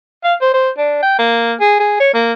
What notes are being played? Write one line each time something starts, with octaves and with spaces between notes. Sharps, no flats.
F5
C5
C5
D4
G5
A#3
G#4
G#4
C#5
A#3